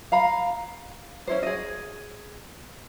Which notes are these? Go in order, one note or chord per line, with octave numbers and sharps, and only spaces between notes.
F5 A#5 B5
C#4 E4 C5
G#4 D#5